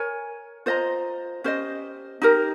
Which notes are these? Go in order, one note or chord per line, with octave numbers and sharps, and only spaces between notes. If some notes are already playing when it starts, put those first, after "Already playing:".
Already playing: A#4 C#5 G#5
F4 C5 D#5 A#5
C#4 G4 C5 D#5
D#4 G4 A#4